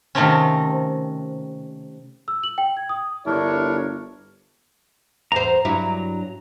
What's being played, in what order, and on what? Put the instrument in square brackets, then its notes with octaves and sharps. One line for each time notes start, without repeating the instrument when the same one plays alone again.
[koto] C3 D#3 A3 A#3 C4 C#4
[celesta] E6
F#7
G5
G#6
D#6
[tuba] G1 [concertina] D4 A#4 [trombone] E4 [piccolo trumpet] C#5
[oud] E2 C5 [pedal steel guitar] A#5
[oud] G2 F#3 E4